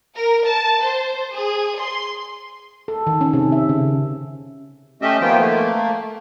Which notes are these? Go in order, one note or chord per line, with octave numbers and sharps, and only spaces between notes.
A#4
A5
C5
G#4
C6
A4
D#3
C#4
C3
E5
C#3
A3 C#4 G4 D#5 E5
D#3 F3 A#3 B3 F4 G5
A3 A#3